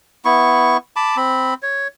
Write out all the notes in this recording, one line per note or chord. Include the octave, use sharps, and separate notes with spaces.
B3 E4 C#6
A5 B5 D6
C4 B5
C#5